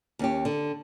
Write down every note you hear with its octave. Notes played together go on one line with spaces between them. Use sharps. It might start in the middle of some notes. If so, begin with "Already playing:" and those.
D#2 C#4 G4
D3